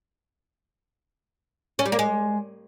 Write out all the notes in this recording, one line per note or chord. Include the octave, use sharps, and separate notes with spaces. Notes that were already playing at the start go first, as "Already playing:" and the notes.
C#4
G3
A#3
G#3